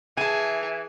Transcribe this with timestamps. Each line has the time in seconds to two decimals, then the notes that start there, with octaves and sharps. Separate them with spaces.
0.17 E3 G#4 E5 G#5 A5